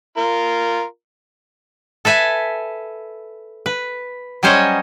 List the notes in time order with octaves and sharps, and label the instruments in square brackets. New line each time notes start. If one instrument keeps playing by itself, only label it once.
[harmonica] F4 A#4
[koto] A4 B4 E5 G#5 A5
B4
F#3 G3 C#4 C5 C#5 D#5